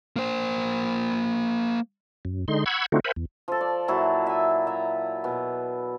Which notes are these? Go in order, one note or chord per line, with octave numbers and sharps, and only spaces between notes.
A#3 C5
F#2
D3 G#3 D#4 C6
F#5 B5 C#6 E6 G#6
D3 A3 C4 D#4 F4 F#4
A#4 C5 E5 F#5 G#5 B5
E2
F3 A4
D5
A#2 F#3 E4 A4
E5 G#5
E5 A#5
B2